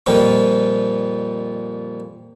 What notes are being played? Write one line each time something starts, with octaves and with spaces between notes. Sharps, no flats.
F2 A#2 F3 G3 D#4